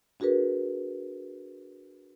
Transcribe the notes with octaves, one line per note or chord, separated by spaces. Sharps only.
D4 F#4 G#4 A#4 B4